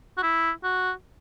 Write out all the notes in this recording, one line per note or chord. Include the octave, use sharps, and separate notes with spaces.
F#4
E4
F#4